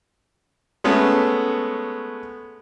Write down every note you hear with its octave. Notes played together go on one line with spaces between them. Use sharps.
G#3 A3 B3 C#4 A4